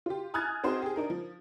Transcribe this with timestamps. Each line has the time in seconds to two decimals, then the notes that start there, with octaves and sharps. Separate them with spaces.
0.06 F4 G4
0.34 G#5 D#6 F6 F#6 G#6 A6
0.64 C4 D#4 F#4 G#4 C5
0.82 G4 G#4
0.96 D4 D#4 A#4
1.10 F3